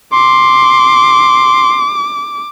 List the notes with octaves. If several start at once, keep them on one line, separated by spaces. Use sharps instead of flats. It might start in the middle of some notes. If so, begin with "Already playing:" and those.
C6 D6